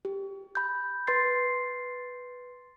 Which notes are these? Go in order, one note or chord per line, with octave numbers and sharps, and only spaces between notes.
G4
B5 G6
B4 C6 A6 C7